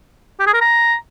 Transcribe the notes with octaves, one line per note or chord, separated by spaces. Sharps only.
G4
G#4
A#4
A#5